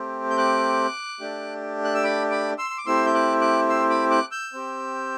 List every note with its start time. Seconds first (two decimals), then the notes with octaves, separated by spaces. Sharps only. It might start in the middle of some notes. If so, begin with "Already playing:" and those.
Already playing: A3 C4 G4
0.30 G6
0.38 D6 F#6
1.20 A3 D4 G4
1.85 F#6
1.94 E6
2.03 B5 D6
2.31 B5 D6
2.58 C6 E6
2.70 C6
2.78 D6
2.86 A3 C4 E4 G4 C6 E6
3.06 G6
3.14 D6 F#6
3.41 D6 F#6
3.69 C6 E6
3.90 B5 D6
4.10 D6 F#6
4.31 E6 G6
4.53 C4 G4